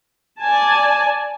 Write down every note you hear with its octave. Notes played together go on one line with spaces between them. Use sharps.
D5 G#5 A5